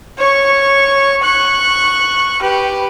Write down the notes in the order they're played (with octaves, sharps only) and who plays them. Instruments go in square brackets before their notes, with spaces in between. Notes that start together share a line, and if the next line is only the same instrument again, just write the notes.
[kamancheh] C#5 C#6
C#6 F#6
G4 B4